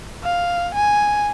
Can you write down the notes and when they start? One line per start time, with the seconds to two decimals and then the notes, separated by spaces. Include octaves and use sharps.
0.24 F5
0.74 G#5